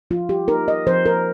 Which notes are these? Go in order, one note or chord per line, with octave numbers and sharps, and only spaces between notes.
F3 F4
G4
D#4 A#4
D#5
F3 C5
A#4